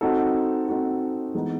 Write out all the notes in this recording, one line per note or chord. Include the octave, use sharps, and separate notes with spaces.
C4 D#4 F#4 A4
C4 D#4 F#4 A4
E3 G#3 B3 D#4